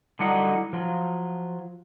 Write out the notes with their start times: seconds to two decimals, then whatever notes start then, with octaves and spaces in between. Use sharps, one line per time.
0.19 D3 F#3 G3 D#4 E4 F#5
0.73 F3 F#3 F4